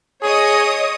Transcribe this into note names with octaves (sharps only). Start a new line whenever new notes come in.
G#4 C#5 D#5 D#6